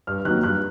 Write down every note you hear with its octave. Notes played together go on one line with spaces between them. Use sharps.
G2 F6
D#3 F#3 A#3 F#6
G2 F#6